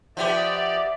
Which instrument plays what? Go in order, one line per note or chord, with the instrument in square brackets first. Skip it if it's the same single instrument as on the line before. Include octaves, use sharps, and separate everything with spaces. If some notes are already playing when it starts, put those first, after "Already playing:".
[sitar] F3 B3 G4 [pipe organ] D5 [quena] E5
[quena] E5